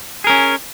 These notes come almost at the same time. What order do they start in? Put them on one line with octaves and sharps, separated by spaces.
G#4 A#4 C#4